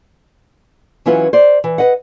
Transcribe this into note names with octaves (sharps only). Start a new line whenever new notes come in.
E3 F#3 C#4 E4 F4 B4
C5 D5
E3
B4 D#5 F#5